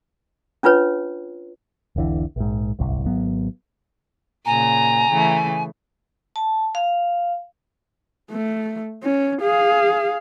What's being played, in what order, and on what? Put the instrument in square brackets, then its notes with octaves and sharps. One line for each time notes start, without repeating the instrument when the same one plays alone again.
[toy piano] C#4 D4 F4 B4 C#5
[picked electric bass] E1 B1 D3 E3
A#1 G#2
D1 G1 C2
G#1 F#3 B3
[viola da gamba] A#2 C#3 [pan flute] G#5 [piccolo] A#5
[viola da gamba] C#3 E3 A3
[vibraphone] A5
F5
[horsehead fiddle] A3
C#4
G#4 F5